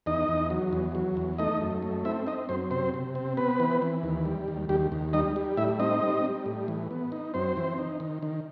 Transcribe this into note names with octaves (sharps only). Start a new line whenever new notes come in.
E2 D#4 D#5
E2
F#3
E2
F#3
E2
A3 D#4 D#5
F#2
A3
C4 E4 E5
C4 D#4 D#5
F#2 C4 C5
C3 C4 C5
C3
C4
B3 C4 B4
E3
E3
D#2
G3
D#2
D#2 G3 G4
D#2
G3 D#4 D#5
G3
A2 E4 E5
C4 D#4 D#5
G3
G3
A2
E3
B3
D#4
F#2 C4 C5
E3
D#4
D#3
D#3